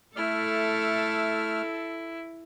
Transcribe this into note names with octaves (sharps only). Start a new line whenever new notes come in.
A3 E4 A4 F6